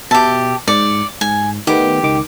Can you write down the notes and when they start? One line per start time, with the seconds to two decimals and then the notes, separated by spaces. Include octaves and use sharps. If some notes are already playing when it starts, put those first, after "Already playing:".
0.11 B2 G4 E5 A5
0.68 G#2 D5 C#7
1.21 G#2 G#5
1.67 D#3 A3 B3 G4
2.03 C#2 D#3 D6